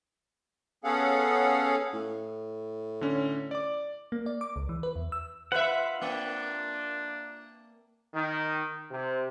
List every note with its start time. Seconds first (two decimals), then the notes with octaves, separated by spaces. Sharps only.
0.84 B3 C#4 G#4 A4 F5 F#5
1.93 A2
3.01 D3 C#4
3.51 D5 D6
4.12 A#3
4.26 D5
4.41 D6
4.56 C#2
4.69 E3
4.83 B4
4.96 E2
5.12 E6
5.52 F4 B4 E5 F#5
6.02 A#3 D4
8.14 D#3
8.91 C3